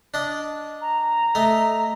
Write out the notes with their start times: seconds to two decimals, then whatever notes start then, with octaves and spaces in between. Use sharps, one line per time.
0.14 D4 D#5
0.81 A#5
1.35 A3 D#5 G#5